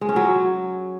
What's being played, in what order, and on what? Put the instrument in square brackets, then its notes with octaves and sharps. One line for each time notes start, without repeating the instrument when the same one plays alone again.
[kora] G#3
C#4
F#3